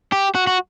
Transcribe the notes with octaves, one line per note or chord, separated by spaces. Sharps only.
G4
F#4
F#4